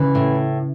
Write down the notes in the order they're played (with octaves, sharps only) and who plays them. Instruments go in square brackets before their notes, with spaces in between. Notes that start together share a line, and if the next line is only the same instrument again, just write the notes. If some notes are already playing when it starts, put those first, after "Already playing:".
Already playing: [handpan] C#3 [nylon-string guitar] E3
[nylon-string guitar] A2